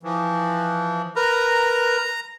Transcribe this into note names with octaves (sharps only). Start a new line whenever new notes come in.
E3 F3
A#4 B4 A#5